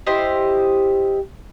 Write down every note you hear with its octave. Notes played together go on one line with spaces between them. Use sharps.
E4 G4 C5 D#5